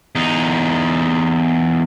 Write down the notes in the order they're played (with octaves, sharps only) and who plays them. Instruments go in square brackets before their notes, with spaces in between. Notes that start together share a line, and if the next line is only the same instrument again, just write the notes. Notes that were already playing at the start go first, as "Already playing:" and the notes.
[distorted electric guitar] E2 D#4